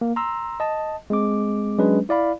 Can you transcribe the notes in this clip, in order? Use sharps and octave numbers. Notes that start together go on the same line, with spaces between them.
A#3
A#5 C6 E6
D#5 A5
G#3 C4 D6
F#3 G#3 C#4 D4 B4
E4 D5 F5 B5